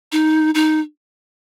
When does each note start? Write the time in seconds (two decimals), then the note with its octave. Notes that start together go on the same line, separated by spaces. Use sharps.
0.12 D#4
0.55 D#4